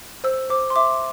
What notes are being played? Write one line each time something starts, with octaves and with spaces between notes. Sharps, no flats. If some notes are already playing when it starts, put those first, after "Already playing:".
C5 E6
C5 D6
C6
E5 D6